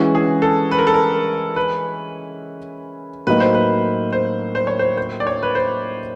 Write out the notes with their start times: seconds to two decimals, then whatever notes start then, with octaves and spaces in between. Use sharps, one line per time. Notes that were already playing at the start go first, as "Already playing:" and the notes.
Already playing: E3 G#3 C#4 E4 F#4
0.15 G#4
0.42 A4
0.71 B4
0.79 A#4
0.87 A4
0.94 A#4
1.56 B4
3.27 A2 F#3 A#3 D#4 B4
3.40 C5
3.54 B4
4.13 C5
4.55 C5
4.67 C#5
4.79 C5
4.97 C5
5.20 D5
5.27 C#5
5.43 B4
5.55 C5